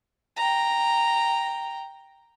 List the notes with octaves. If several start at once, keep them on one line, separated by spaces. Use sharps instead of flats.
G5 A#5